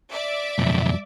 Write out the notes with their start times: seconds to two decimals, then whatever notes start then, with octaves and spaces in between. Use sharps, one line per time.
0.12 D5 E5
0.59 B1 F2